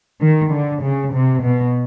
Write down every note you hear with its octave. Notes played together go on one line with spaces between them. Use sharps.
D#3
D3
C#3
C3
B2